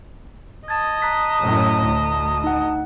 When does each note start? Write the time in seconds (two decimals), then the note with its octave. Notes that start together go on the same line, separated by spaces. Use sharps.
0.68 D#5 A5 D#6 G#6 A6
1.02 A#5 F#6 B6
1.41 F#2 A2
1.83 D2
2.44 D#4 F#5